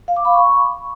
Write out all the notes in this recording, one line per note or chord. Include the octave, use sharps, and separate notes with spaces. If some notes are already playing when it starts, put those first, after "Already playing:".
F5
D6
B5
C#6